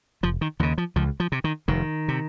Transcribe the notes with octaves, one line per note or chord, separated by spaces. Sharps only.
F1 F3
D#3
D#2 C#3 F3
F3
C#2 F3
F3
C3
D#3
F1 D#3
C3